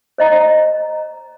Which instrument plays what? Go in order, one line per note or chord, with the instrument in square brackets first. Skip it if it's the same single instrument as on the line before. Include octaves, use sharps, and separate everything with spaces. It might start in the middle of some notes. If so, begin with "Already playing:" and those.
[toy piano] C5 D#5 A#5